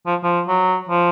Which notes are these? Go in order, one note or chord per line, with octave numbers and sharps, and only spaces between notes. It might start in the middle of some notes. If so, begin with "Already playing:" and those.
F3
F3
F#3
F3